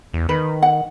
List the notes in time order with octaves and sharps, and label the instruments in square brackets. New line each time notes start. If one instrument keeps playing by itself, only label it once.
[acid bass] E2
[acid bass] D#3 [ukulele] B4
[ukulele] F#5